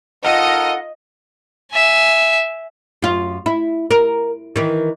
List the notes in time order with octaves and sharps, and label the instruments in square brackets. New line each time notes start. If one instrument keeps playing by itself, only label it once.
[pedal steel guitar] D#4 A4 A#4 [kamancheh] F4 [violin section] D#5 [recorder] F#5
[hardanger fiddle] E5 G#5
[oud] F#2 F4
E4
A#4
D#3 E3